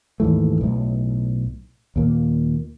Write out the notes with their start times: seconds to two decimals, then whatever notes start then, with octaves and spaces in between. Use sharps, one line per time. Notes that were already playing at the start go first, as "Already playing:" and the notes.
0.20 D#2 G#2 E3 A3
0.61 B1 A2
1.96 D#2 A#2 A#3